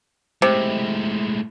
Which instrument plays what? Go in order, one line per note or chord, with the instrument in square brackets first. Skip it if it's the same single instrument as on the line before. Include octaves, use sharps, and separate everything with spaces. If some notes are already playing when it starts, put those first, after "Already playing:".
[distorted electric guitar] A2 G#3 [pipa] C3